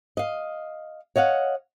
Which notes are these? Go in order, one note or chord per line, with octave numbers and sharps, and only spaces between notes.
D#5 F5
C#5 D#5 F5 F#5